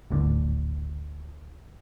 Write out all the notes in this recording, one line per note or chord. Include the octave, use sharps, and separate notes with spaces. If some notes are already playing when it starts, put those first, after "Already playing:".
D1 G#1 A2 D3